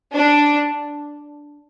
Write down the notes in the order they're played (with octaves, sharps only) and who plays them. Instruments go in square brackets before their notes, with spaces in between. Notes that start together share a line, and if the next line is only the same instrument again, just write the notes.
[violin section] D4